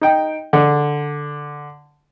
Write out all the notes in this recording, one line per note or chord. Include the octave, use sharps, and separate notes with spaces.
D#4 G5
D3